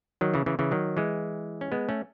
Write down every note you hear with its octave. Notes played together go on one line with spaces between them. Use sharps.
D#3 F#3
C#3 E3
C#3 E3
C#3 E3
D#3 F#3
E3 G#3
C#4
G#3 B3
A3 C#4